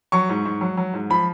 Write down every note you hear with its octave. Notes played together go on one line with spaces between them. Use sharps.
F#3 C#6
G#2
G#2
F#3
F#3
G#2
F3 B5